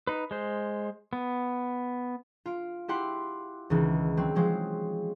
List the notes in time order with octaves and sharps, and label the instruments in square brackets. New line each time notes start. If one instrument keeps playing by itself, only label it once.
[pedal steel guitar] D#4 B4
G#3 C5
B3
[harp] F4 D7
E4 G4 F#5 C6
C#2 D#3 E3
F#3 C4
F3 F#3 G#3 C5